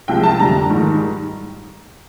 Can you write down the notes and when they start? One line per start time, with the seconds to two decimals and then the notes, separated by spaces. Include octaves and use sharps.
0.08 C2 C3 F3 G#3 G5
0.23 A5
0.38 F2 D3 G3 A#5
0.70 G#2 D#3 G3